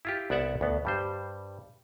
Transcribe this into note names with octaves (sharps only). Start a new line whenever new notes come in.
E4 F4 G4
C2 B3 D5 E5 F#5
D2 B3
G2 G3 C5